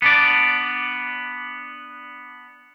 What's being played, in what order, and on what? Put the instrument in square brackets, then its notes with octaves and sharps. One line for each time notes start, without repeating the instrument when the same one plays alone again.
[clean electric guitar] B3 D4 D5